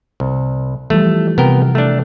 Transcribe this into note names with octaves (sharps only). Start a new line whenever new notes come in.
C2
E3 F3 G3 A3
C3 B3 A#4 G5
A3 D4